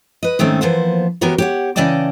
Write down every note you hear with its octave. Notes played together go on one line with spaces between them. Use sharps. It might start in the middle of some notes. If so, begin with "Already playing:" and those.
B4 D#5
G#2 D#3 A3 C4 C#4
E3 F3 A#3 B3 C5
E3 B3 F#4 G4 A#4 C#5
G4 C#5 F#5
C#3 E3 D5 D#5 G5 A5